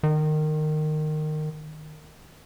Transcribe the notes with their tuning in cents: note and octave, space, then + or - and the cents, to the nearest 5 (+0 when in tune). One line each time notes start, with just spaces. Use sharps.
D#3 -20